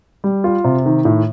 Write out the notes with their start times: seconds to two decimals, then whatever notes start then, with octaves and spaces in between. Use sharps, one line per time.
0.24 G3
0.44 F4
0.64 C3
0.86 D#3
1.05 A2